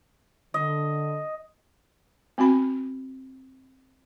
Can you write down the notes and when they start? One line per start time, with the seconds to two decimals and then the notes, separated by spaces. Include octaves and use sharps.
0.54 D3 D#5
2.38 B3 C4 F#4 B5